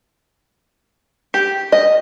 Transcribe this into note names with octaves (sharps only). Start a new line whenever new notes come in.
G4
D#5